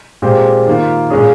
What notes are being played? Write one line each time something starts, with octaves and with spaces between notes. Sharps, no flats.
A#2 G#3 C4 G4 C5
D#3 A#3 F4
A#2 G#3 C#4 G#4